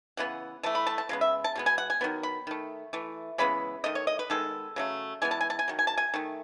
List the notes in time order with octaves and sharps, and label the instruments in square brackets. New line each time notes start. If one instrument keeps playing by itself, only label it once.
[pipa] C#3 E3 B3 F#5
E3 A3 A5
B5
A5
A5
C#3 G#3 B3
E5
A5
B2 G#3 B3
G#5
F#5
G#5
D#3 F#3 B3
B5
D#3 A3
E3 A3
C#3 E3 G#3 B3 B5
D#3 A3 D#5
C#5
D#5
B4
D#3 G#3 B3 A4
C#3 F#3 A3
E3 G#3 B3 G#5
A5
G#5
A5
G#5
D#3 F#3
G#5
A5
G#5
D#3 A3